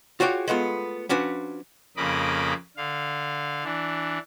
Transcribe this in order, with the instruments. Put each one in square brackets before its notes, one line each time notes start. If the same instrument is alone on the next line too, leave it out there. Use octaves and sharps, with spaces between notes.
[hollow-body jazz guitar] F4 F#4 G#4 C#5 D5 G5
G#3 A3 B3 F4
F3 C#4 D4 F#4 B4
[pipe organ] F2 C#3 A#3 D#5 B5 D6
D3 F5
E3 D4